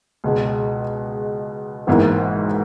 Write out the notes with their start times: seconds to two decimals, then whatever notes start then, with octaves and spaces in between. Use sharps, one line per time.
0.24 C#2 B2 G#3
1.87 G#1 G#2 E3 A#3 E4